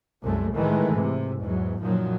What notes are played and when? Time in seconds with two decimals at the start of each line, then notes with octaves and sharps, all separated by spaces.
0.23 C2 F#2 G#3 A3
0.55 A2 D#3 E3 G#3 A3
0.91 G#2 C3
1.43 E2 G#2 F#3
1.83 F#2 A#2 D#3 F3 F#3